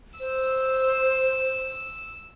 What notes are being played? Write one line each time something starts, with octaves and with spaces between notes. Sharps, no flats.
C5 E6